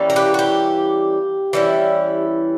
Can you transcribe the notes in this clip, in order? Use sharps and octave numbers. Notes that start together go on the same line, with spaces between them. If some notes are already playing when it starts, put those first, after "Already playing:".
Already playing: E3 G3 A#3 C#4
A#4
G4 B4
F#4
G4
E3 G3 C#4 E4